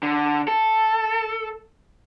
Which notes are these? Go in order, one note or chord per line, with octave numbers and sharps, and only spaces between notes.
D3
A4